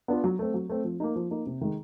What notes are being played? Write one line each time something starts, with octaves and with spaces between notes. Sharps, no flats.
B3 D4 F4
F#3
A3 C4
F#3
A3 C4
F3
A#3 D#4
F3
A#3 D#4
C3
D#3 G#3